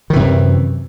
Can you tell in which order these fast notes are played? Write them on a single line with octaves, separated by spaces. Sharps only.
D#3 E3 C3 F#2